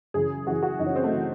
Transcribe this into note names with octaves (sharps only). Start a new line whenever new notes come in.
F#2 C#3 E3 G#4
F#2 C#3 E3 F#4
F#4
F#2 C#3 E3 D#4
C#4
C4
A3
C#3 E3